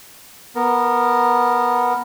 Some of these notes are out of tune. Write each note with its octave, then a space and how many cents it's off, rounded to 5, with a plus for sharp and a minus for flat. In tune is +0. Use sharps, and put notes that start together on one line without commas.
B3 -10 A#4 +0